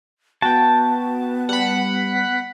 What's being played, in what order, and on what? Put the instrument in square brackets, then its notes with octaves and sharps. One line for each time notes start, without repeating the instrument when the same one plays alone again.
[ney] B3 [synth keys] F#4 G5 [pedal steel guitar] A5
[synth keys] G3 [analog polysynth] F#5 B5